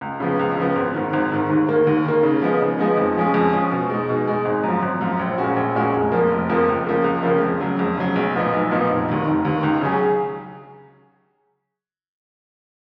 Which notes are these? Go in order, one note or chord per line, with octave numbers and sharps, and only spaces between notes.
C#2
C#3 F3 B3
C#2
C#3 F3 B3
G#1
G#2 D#3
G#1
G#2 D#3
D#2
D#3 A#3
D#2
D#3 A#3
C#3
F3 G#3 B3 D#4
C#3
F3 G#3 B3 D#4
F2
F3 G#3 C#4 G#4
F2
F3 G#3 C#4 G#4
B2
G#3 D#4
B2
G#3 D#4
G#1
F#2 F3
G#1
F#2 F3
A#1
A#2 G#3 C#4 F#4
A#1
A#2 G#3 C#4 F#4
F1
F2 F3 A#3
F1
F2 F3 A#3
C#2
C#3 F3 A#3
C#2
C#3 F3 A#3
F2
C#3 F#3
F2
C#3 F#3
B1
A#2 F3 B3 D#4
B1
A#2 F3 B3 D#4
F1
D#2 D#3
F1
D#2 D#3
C#2
C#3 F#3 C#4 G#4